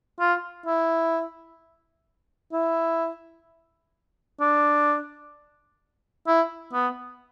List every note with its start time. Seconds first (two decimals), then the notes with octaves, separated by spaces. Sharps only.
0.20 F4
0.66 E4
2.53 E4
4.41 D4
6.27 E4
6.73 B3